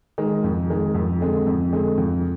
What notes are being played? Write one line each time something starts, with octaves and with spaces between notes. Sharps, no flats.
D#3 G#3
F2
D#3 G#3
F2
D3 G#3 C4
F2
D3 G#3 C4
F2